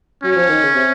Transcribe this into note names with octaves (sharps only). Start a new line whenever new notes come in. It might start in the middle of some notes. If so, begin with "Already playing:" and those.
F#3 C#4
F3
D#3
C#3
C3